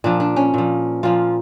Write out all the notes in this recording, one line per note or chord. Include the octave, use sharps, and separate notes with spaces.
A#2 F3 D4
D4
C#4
A#2 F3
A#2 F3 F4